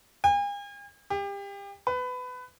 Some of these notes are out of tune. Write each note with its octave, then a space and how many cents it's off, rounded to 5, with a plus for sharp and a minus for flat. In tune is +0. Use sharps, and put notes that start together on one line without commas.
G#5 -45
G4 +30
B4 +20